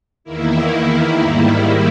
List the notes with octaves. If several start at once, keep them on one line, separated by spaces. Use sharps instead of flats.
E2 D#3 A#3 E4
G#2 D#3 G3 A#3 E4